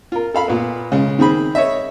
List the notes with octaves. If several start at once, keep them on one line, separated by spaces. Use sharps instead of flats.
F4 A#4
A4 F5 B5
A#2 B3
C#3 G#3
D#3 C4 G#4 B5
C#5 D#5 E5